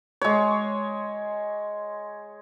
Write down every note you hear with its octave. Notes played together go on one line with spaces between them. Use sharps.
G#3 C#5